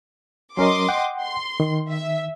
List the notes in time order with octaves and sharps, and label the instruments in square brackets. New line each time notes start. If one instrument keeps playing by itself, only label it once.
[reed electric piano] F#3 C#4 A#4 [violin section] D#5 C6 D6
[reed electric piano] F#5 G5
[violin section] C6
[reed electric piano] D#3
[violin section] E5